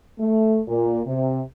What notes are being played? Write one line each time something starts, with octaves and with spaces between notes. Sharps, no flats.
A3
A#2
C3